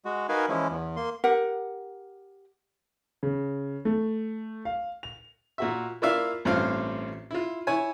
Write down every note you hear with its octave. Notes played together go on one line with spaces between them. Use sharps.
G#3 F#4
D#4 F#4 A#4 B4 F5 G#5
E3 F3 G#3 C#4 E4
E2
A#3 C6
G4 A#4 F#5
C#3
A3
F5
F7
A#2 F#4 E5
A#3 E4 F4 D5 E5 F5
A1 G2 C4 F4 F5
E4 F4
E4 C#5 G#5